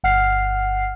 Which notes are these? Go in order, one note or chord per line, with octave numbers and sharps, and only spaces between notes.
G1 F#5 F6 C7